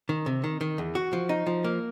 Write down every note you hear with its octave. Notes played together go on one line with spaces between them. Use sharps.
D#3
C3
D#3
D#3
E2
F#4
F3
D#4
F3
A#3